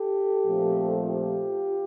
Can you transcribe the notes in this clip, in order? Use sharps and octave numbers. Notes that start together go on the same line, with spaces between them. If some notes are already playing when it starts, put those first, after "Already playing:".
Already playing: G4 A4
A#2 F3 A3 C4
F4 G4